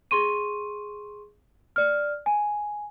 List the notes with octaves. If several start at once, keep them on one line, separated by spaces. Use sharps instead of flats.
G#4 C6 C#6 D#7
D5 F6
G#5